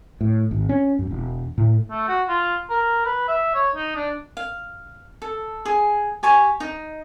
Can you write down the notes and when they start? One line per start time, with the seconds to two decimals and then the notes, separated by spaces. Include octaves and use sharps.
0.21 A2
0.51 G#1
0.69 C#4
0.99 F#2
1.11 E1
1.58 A2
1.90 A3
2.08 F#4
2.29 F4
2.70 A#4
3.05 B4
3.28 E5
3.55 C#5
3.76 D#4
3.95 D4
4.37 F5
5.22 A4
5.65 G#4
6.23 G4 G#5 C#6
6.60 D#4